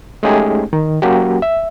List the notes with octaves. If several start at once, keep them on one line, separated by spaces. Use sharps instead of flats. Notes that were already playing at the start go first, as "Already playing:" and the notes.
G#3 A3 C#4 D#4 G4 G#4
D#3
F#3 A#3 C#4 F#4 G4
E5